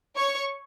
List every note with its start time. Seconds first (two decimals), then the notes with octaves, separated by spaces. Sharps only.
0.16 C#5 C#6